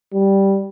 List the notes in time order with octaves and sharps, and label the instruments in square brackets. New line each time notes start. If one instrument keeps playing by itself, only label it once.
[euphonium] G3